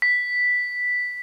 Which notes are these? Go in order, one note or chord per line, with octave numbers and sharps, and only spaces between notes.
B6